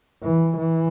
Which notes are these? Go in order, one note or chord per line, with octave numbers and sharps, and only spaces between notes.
E3
E3